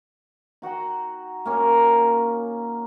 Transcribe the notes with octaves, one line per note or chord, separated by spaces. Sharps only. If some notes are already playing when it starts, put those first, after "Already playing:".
D#4 F#4 F#5 G5
A#3 C#4 D#4